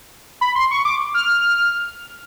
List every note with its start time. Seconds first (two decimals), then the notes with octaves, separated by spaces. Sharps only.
0.41 B5
0.55 C6
0.71 C#6
0.85 D6
1.14 F6